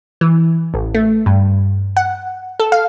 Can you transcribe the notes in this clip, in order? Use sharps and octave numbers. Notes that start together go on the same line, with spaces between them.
E3
A1
A3
G2
F#5
A4
F5